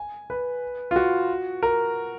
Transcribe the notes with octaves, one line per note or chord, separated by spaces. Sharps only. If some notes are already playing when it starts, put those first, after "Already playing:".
Already playing: G#5
B4
F4
F#4
A#4